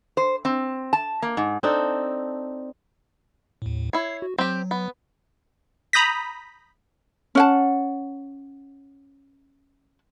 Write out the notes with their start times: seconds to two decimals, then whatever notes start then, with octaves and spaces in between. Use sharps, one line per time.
0.17 C5
0.45 C4
0.93 A5
1.22 A#3
1.37 G#2
1.63 C4 D4 D#4 A4
3.62 D#2 A2
3.93 E4 C#5 C7
4.22 F#4
4.38 F#3 C4 G4
4.71 B3
5.93 A#5 B5 D#6 G6 A#6 B6
7.35 C#4 F#5 A5